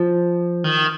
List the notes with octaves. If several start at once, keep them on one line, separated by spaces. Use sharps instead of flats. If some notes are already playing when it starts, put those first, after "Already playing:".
Already playing: F3
D#3